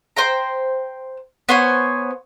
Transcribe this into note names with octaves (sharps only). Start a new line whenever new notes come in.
C5 G5 A#5
B3 C5 C#5 G#5